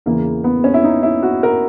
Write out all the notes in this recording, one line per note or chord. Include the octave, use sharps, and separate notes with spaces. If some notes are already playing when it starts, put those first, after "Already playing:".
E2 C#3 E3 A#3
B3
C#4
E4
D#4
E4
F#4
A#4